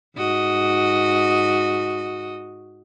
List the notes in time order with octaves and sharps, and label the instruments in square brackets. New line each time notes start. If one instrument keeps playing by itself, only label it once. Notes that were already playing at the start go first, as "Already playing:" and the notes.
[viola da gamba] G#2 F#4 D#5